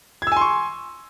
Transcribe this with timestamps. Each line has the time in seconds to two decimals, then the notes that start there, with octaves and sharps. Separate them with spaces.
0.22 G#6
0.27 E6
0.32 G#5
0.37 C6
0.41 C#6